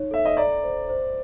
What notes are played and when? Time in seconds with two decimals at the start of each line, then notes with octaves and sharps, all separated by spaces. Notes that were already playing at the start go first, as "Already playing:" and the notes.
Already playing: D#4 C#5
0.11 A4 E5
0.25 D#5
0.37 D5 A#5
0.63 C5
0.89 C5